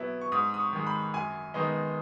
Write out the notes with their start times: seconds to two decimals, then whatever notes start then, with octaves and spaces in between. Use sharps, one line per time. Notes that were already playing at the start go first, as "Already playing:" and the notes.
Already playing: B2 F#3 B3 E4
0.21 C#6
0.32 G#2 D#6
0.54 D#6
0.59 C#6
0.73 D#3 G#3
0.87 B5
1.14 F#2 G#5
1.54 D#3 G#3 B3 D#4